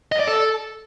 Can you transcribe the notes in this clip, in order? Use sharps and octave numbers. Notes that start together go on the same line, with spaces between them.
D#5
D5
A4